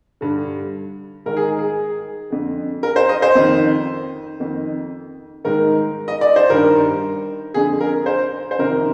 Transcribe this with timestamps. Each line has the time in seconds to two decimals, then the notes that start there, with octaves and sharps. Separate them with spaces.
0.21 G2 D3
1.26 G#2 D#3 A#4
1.37 G#4
1.59 G#4
2.30 F2 D3
2.83 A#4
2.96 C5
3.09 D#5
3.22 C5
3.35 F2 D#3
4.40 F2 D#3
5.44 G#2 D#3 A#4
6.08 D#5
6.21 D5
6.36 C5
6.49 G2 D#3 A#4
7.54 F2 D3 G#4
7.81 A#4
8.06 C5
8.51 C5
8.59 F2 C3 D#3 A#4